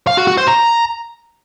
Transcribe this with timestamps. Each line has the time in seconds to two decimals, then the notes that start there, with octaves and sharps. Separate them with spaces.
0.07 F5
0.17 F#4
0.27 F#4
0.38 C5
0.48 A#5